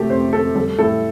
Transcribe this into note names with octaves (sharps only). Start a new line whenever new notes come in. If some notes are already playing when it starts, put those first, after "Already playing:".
Already playing: C3 A3 G4 A4
F2 C5
F2 A4
G3 A4
A2 A4